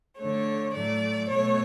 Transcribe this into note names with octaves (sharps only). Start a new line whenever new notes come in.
D3 A3 C#5
A2 F#3 A3 D5
B2 A3 C#5